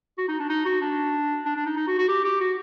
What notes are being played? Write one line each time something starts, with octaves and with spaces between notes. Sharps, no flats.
F#4
D#4
D4
D#4
F#4
D4
D4
D4
D#4
D#4
F#4
F#4
G4
G4
F#4